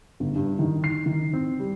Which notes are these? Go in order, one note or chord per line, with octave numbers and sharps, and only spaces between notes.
G1
G2
D#3
C7
D#3
C4
G3